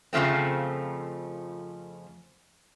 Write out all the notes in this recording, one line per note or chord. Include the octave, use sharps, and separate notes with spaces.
F2 C#3 F3 A3 C4